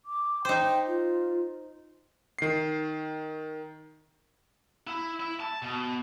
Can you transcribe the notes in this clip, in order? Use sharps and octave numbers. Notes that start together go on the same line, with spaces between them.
D6
D#4 C5 G5
F4
D#3 C7
E4
E4
A5
B2